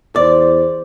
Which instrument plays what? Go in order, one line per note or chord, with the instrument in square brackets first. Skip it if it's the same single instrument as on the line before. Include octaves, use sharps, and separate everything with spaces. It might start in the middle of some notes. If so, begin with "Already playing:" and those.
[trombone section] E2 C5 [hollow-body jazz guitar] D5